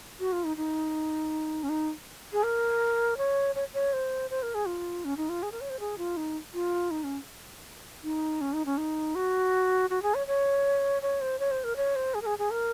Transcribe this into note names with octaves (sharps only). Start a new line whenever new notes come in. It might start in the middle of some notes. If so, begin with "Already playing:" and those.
F#4
F4
D#4
D#4
C#4
D#4
G#4
A#4
C#5
C#5
C#5
C5
C5
A#4
G#4
F4
C#4
D#4
F4
G#4
A#4
C#5
C5
G#4
F4
D#4
F4
D#4
C#4
D#4
C#4
D#4
C#4
D#4
F#4
F#4
G#4
C#5
C#5
C#5
C5
C#5
C5
A#4
C#5
C5
G#4
A#4
G#4
G#4
A#4